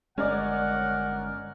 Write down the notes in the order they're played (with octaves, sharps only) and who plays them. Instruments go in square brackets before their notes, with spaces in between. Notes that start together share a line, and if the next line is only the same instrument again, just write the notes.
[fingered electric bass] G1 G#3 [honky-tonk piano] C#4 D5 D#5 [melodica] A#4 [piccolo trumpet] F#5